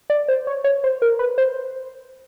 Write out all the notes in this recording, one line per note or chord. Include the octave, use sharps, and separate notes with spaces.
D5
C5
C#5
C#5
C5
A#4
B4
C5